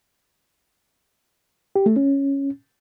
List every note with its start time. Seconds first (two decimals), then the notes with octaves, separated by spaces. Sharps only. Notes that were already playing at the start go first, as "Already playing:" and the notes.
1.76 G4
1.86 A3
1.96 C#4